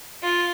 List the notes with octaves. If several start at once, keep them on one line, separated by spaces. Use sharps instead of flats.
F4